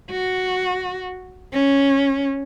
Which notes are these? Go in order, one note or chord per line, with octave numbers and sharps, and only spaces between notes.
F#4
C#4